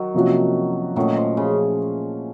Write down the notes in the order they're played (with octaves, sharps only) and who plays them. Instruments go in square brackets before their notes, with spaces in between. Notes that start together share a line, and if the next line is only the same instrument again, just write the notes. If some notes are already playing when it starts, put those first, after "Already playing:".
Already playing: [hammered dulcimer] D#3 F#3
[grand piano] C3 F3 A#3 C#4 F#4
[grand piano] A#2 A3 C#4 [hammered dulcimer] D#3 F#3
[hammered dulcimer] F3
C#3